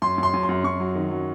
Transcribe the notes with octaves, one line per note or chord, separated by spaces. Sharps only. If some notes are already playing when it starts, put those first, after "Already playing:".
F#2 C6
F#2
C6
F#2
C6
F#2
F#2 C#6
F#3
D#3
F#3